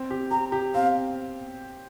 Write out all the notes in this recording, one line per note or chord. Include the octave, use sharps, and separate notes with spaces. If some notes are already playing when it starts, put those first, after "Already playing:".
Already playing: C4
G4
G4 A#5
G4
C4 F5